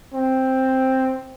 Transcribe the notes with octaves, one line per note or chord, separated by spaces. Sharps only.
C4